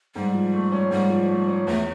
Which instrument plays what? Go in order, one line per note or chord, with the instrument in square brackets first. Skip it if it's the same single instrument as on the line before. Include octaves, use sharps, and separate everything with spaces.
[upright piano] G#2 [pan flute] G3
[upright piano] F3
A3
C#4
[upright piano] G#2 [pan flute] G3
[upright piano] F3
A3
C#4
[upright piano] E2 [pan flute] A3